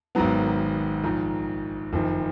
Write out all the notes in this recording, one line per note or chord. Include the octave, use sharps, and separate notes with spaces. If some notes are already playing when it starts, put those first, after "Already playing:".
G#1 G#2 D#3 F#3 B3
A#1 G#2 D#3
F#1 F2 D#3